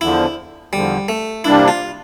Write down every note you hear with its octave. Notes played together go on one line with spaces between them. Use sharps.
E2 D3 F3 E4
E2 D3 F3 G3
A3
C3 G3 A#3 D4 E4
F4